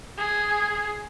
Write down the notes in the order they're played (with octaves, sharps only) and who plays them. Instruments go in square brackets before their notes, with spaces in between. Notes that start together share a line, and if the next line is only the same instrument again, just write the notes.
[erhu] G#4